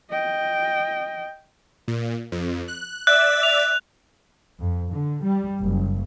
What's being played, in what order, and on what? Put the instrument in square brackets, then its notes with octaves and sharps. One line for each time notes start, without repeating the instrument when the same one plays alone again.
[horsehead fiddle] D#5 G5
[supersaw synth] A#2
F2
F#6
[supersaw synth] D5 E5 E6 [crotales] F#6
[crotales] F7
[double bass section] F2
D3
G3
F#1